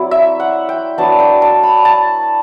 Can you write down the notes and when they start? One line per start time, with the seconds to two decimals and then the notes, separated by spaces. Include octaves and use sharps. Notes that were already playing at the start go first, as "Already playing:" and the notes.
Already playing: F#3 C4 E4 D5
0.11 E5
0.40 F#5
0.69 G5
0.98 F#3 B3 D4 A5
1.20 G5
1.42 A5
1.63 B5
1.85 A5